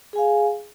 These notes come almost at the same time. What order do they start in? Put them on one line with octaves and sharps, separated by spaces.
G#4 G#5 F5